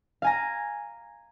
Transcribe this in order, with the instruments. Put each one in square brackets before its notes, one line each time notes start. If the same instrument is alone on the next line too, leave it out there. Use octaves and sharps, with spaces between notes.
[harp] F5 G#5 A#5